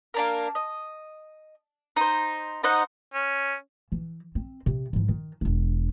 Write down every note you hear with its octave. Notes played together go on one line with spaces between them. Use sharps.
A#3 D4 A#4
D#5
D#4 C5
D#4 C5 D#5 F#5
C#4
E3
C4
C3
G#2 E3
D#3
E1 D4